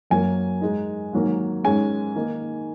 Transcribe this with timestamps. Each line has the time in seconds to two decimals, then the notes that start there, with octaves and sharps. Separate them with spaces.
0.10 F#2 F#3 A#3 G#5
0.61 G#2 G#3 D#4
1.13 G#2 D#3 F#3 A#3
1.64 G#2 G#3 C#4 G#5
2.15 D#3 A#3 D#4